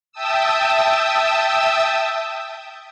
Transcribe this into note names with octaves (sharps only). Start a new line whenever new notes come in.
E5 G5 A5 D#6 E6